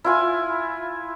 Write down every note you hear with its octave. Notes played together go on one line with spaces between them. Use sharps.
E4 F4 G#5